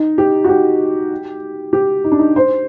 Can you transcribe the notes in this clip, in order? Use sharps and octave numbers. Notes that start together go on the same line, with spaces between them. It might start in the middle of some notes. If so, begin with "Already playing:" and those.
Already playing: D#4
G4
F#4
G4
G4
D#4
D4
D#4
C5